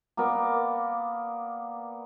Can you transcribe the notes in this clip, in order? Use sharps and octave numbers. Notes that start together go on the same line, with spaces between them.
A#3 B3 A#4 D5